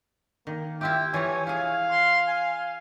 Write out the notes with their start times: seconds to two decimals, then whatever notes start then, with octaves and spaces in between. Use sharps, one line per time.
0.47 D#3 A#3
0.81 E4 F4 G4 E5 G5
1.14 E3 F3 E4 C#5 G#5
1.47 E4 G#4 F5
1.90 C6
2.27 G#5